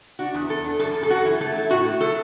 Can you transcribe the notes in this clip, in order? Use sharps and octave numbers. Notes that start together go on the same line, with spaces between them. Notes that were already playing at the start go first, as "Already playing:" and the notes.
D4 F#4
E2
E2 A4
D4
F#2 A4
F#2
A4
F#2 F#4
E3
A3 A4
E4
A2 F#4
A3
F#3 A4